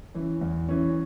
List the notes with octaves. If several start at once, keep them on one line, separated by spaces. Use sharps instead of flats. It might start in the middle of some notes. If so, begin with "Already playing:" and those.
E3 C#4
E2
E3 C#4